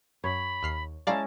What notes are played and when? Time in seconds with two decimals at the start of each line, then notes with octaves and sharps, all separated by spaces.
0.24 F#2 C#5 B5
0.63 D#2 F6 C7
1.07 G#3 C#4 E4 D5 F5 A5 A#5